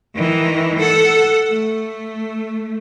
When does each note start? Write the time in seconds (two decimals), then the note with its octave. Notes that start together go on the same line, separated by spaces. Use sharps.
0.15 D#3 E3
0.78 A4 F#5
1.48 A3